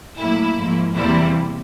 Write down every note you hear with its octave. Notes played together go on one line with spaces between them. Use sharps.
A2 F#3 A#3 E4
G#2 F3 A#3
E2 C3 E3 G3 A#3 E4